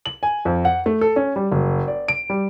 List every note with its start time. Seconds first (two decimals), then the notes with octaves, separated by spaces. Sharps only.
0.06 F#7
0.23 G#5
0.45 F2
0.65 F#5
0.86 A3
1.01 A4
1.16 C#4
1.36 G3
1.52 F#1
1.88 D5
2.08 D7
2.30 G3